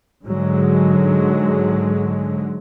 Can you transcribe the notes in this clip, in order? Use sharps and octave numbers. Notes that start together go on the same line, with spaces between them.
G#2 D3 F#3 G#3